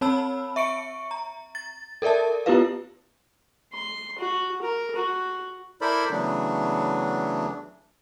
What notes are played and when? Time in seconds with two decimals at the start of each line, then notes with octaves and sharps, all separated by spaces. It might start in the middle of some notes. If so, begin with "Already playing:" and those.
0.01 C4 C#5 A5 B5 E6
0.56 E5 C#6 C#7 D7
1.11 A#5
1.55 A6
2.02 A4 A#4 D5 E5 A5
2.46 B3 E4 F4 G4 B4 F5
3.73 C6
4.19 F#4
4.62 A#4
4.95 F#4
5.81 E4 A4 A#4 C5 D5 B5
6.11 C#3 E3 F#3 A3 B3 D4